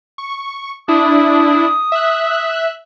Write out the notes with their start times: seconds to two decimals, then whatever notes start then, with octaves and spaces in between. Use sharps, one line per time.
0.18 C#6
0.88 D4 E4 D#6
1.92 E5 F#6